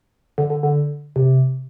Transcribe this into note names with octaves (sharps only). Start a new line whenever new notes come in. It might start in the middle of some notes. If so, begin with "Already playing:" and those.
D3
D3
D3
C3